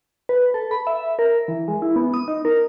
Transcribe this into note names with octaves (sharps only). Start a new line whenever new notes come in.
B4
A4
B5
E5
A#4
E3
G#3
E4
B3
D#6
D#4
A#4